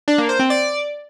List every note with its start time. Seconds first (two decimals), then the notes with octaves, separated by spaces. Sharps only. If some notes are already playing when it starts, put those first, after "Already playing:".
0.08 D4
0.18 A#3
0.29 C5
0.40 C4
0.50 D5